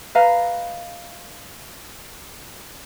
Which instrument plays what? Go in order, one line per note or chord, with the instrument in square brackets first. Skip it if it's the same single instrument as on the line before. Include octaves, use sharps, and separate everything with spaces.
[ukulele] B4 D#5 F5 A#5